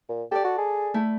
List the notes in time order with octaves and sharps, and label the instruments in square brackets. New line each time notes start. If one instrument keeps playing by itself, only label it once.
[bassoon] A#2
[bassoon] G4 [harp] A4 D5
[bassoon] F#4
G#4
[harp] A3 E4